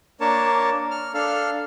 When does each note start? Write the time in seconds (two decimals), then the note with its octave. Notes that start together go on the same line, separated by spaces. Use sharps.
0.20 A#3 D4 A#4 C#5 A5
0.91 F6
1.14 D4 A4 F5 F6